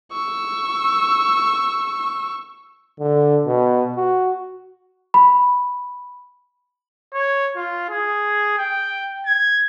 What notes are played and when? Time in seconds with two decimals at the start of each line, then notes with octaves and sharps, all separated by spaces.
0.12 C#6 E6
3.00 D3
3.46 B2
3.96 F#4
5.14 B5
7.14 C#5
7.56 F4
7.90 G#4
8.58 G5
9.26 G#6